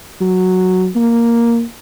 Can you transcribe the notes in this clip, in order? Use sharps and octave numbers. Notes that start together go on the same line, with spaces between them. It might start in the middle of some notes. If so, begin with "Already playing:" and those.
F#3
A#3